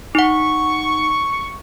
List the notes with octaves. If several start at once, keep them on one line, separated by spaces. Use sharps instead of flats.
D#4 F#5 C#6